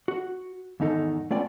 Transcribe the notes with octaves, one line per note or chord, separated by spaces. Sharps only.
F#4
E2 G#2 D#3 D#4 A4
A3 B3 C#4 F4 D5 G5